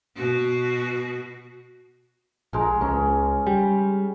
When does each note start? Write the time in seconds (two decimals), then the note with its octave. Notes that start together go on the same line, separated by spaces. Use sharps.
0.15 B2 F#4
2.53 A#1 G#3 A#4
2.81 C#2 G#3 C#4
3.47 G3